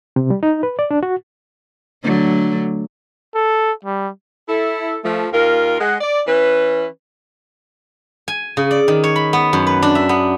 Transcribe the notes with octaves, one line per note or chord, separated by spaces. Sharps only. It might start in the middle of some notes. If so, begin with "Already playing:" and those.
C3
G3
D#4
B4
D5
D4
F#4
D3 F#3 A3
A4
G3
E4 A4
F3 A3
D#2 F4 A#4
G#3 F#5
D5
E3 C#4 B4
G#5
C#3
D5
D#3
C#5
B5
B3
F#2
B4
D4
E5
B3